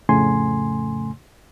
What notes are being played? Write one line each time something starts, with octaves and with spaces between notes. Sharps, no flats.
F2 A2 C#3 A3 G#5 C6